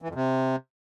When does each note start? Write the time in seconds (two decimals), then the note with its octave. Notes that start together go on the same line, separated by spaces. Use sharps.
0.02 E3
0.08 F2
0.15 C3